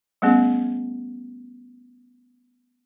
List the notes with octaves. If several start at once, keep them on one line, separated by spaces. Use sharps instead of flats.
G3 A3 B3 C#4 G#4